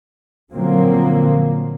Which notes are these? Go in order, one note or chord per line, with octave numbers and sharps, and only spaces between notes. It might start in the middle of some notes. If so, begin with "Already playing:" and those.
A#2 D3 F3 F#3 A#3 C4